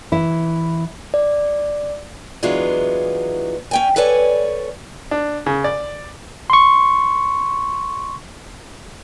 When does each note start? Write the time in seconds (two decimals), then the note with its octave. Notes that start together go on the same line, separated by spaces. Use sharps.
0.12 E3 E4
1.14 D5
2.43 E3 F#3 G#3 B3 D4 F4
3.71 C#4 G5 G#5
3.96 A4 B4 C#5 D5 G#5
5.11 D4
5.46 C#3
5.64 D5
6.50 C6 C#6